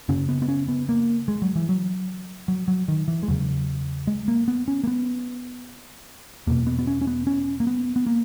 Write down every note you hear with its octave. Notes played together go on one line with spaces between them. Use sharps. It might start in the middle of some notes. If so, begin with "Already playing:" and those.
F#2 C#3 C#4
B3
B3
C#4
B3
A#3
G#3
F#3
E3
F#3
F#3
F#3
D#3
E3
G#3
E2 C#3 F#3
G#3
A#3
B3
C#4
A#3
B3
E2 B2 A#3
B3
B3
C#4
C#4
B3
C#4
A#3
B3
B3
A#3